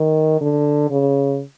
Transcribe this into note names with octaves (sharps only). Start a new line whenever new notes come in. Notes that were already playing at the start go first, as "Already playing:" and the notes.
Already playing: D#3
D3
C#3